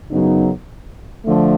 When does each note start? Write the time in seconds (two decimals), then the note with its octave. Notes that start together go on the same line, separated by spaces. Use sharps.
0.11 F#2 C#3 F#3 B3 D#4
1.25 D3 F3 A3